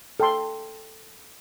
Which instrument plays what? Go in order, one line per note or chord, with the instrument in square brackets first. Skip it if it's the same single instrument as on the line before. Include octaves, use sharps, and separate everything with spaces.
[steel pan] A4 G5 C6